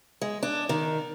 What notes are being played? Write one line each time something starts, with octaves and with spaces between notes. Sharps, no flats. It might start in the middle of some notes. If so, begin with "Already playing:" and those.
G#3
D4
D#3